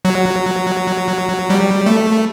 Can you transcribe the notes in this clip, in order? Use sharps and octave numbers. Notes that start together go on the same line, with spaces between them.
F#3
G3
A3